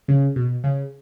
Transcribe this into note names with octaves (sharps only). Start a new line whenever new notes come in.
C#3
B2
C#3